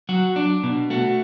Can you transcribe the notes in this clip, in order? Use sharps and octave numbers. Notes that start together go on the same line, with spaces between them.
F#3 F#4
D4
B2
A3 F#4